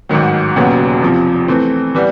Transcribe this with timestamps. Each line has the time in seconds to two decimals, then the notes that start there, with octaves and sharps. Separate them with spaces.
0.09 A1 G#2 D#3 F#3
0.56 E1 D#2 C#3 F#3 B3
1.02 E2 C3 F3
1.48 E3 A3 C4 E4
1.95 E3 G3 B3